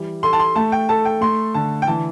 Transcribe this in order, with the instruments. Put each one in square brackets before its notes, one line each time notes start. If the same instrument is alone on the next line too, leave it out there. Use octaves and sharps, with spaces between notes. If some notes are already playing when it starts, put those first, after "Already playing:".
Already playing: [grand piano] E3 G3
[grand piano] A4 [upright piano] C6
[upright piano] A5
C6
[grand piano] A3 [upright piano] A5
[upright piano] G5
[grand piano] A4 [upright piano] A5
[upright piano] G5
[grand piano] A3 [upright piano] C6
[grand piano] D3 [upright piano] A5
[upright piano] G5
[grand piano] E3 [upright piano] A5